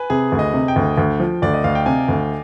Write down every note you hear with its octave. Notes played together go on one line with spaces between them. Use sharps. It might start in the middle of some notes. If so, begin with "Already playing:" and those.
Already playing: B4 G#5
C3 G#4
D2
D#5
C3
G5
D2
D2
F3
D2 D5
D#5
D2 F5
G5
C3 G#5
D2